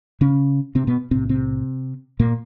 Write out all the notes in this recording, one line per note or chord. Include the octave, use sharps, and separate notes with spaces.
C#3 C#4
C3 C4
B2 B3
B1 A2 C3 C4
C3 C4
A#2 A#3